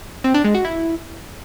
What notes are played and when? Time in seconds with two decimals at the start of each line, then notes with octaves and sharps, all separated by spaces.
0.24 C4
0.34 D4
0.44 G#3
0.55 F#4
0.65 E4